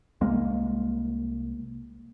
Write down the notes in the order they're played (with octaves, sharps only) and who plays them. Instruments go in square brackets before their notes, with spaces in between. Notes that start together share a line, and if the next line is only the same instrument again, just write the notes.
[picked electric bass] C2 G#3 A#3